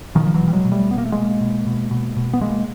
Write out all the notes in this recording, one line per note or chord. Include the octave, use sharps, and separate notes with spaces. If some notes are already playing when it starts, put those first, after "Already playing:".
B2 D#3 F3
F3
E3 F#3
B2
G3
F#3 G#3
B2
G3 A3
B2 B3
A#3
A3
B2 G#3 A#3
B2
B2
B2
B2
B3
B2 G#3 A#3